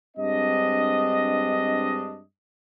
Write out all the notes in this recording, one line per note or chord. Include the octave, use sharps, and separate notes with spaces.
G2 G#3 C4 D4 D#5